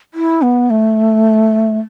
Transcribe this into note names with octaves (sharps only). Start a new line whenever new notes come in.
E4
B3
A3